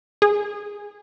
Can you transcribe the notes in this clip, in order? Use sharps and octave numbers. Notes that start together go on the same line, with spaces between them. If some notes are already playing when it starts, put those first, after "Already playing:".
G#4